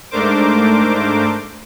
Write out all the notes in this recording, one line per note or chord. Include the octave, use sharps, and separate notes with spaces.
G#2 A3 D4 A#4 C5 D6